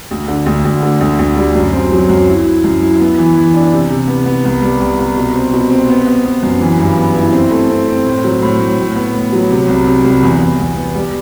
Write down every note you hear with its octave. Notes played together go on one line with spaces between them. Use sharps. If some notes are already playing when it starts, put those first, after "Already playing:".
D2
D3
D2
D2
D3
D2
D2
G3
F#2
C4
F#3
F#2
E4
E4
F#2
E4
B3
E3
E3
D4
C3
C3
B3
B3
C2
G3
C2
C2
B2
C4
B2
C4
B3
B3
B3
F#2
E3
G2
B3
E4
C4
A3
C4
C4
A2
F#3
A2
A2
A2
B3
A2
F#3
C3
C2
C3
C2
E2
E2
E2
B3
G3